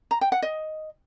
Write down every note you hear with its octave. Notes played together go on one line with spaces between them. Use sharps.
A#5
G5
F#5
D#5